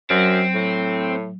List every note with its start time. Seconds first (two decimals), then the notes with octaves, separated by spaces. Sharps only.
0.10 F#2 F#3 C4
0.54 A2